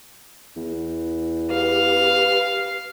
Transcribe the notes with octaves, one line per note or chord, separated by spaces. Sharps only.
E2
G4 B4 F5